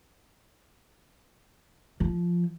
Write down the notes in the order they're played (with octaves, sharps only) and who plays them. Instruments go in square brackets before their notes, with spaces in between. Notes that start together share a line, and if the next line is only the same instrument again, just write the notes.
[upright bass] F3